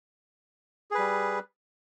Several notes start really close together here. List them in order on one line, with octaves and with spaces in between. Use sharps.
G#4 B4 G3